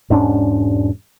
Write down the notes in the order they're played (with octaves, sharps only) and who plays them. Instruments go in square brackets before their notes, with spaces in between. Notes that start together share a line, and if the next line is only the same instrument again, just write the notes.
[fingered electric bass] E1 G#2 C#4 D4